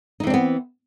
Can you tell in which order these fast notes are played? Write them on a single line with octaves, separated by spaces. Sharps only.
D#4 E3 C4 D4 B3